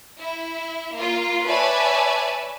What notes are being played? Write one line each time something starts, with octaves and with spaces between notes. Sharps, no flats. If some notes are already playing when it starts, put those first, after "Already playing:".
E4
A#3 F4
B4 C#5 D5 E5 G#5 A5